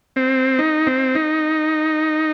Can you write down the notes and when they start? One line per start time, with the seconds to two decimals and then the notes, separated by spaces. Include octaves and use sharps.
0.16 C4
0.59 D#4
0.87 C4
1.15 D#4